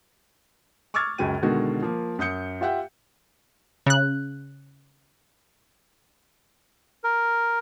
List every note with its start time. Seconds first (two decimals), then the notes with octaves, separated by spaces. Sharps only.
0.94 C#6 D6 E6 F6 G#6 A6
1.18 C#2 F#2 F#4 G5 D#7
1.42 B2 D3 D#3 G#3 F#4
1.82 F3 A#3
2.19 F#2 D#6 G6 C#7
2.61 F4 G4 E5 F#5 G5
3.86 C#3 F#6
7.04 A#4